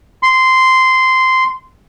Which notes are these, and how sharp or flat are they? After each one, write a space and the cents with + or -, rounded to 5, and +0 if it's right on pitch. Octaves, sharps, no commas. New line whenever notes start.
C6 -10